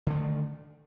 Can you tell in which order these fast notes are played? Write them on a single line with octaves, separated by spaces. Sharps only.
D3 A3 D#3